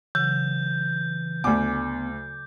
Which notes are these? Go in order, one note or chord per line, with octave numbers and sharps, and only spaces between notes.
C#3 E3 F#3 G6
D2 B3 D5 G#5 D6